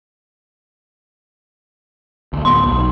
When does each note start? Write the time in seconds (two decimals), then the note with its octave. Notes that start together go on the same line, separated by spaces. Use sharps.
2.33 D2
2.45 D1 B3 C6
2.65 B1